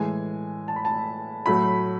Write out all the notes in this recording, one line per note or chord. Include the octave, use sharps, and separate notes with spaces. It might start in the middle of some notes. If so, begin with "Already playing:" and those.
Already playing: A2 E3 G#3 G#5
A5
B5
A5
A2 F#3 A3 B5